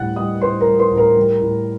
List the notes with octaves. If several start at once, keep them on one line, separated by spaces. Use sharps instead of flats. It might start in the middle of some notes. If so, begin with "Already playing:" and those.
Already playing: A2 G3 F#5 F#6 A6
G3 D#5 D#6
A2 C5 C6
A#4 A#5
G3
C5 C6
A2
A#4 A#5
G3
A2